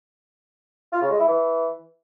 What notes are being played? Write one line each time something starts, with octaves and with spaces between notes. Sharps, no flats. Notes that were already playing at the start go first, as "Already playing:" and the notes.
F4
C#3
G#3
E4
E3